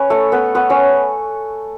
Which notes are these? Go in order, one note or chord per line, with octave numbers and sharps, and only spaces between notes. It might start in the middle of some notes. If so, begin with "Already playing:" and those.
Already playing: C#4 B4 C#5
A3 A4
B3 B4
B3 B4
C#4 C#5